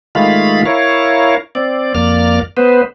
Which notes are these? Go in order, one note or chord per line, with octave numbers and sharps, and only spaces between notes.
D#3 G#3 A3 F4 F5 B5
E4 A#4 C#5 F5
C4 D5
F2 A#3 D5 F6
B3 B4 C5